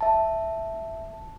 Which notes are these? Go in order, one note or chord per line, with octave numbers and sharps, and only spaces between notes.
E5 A5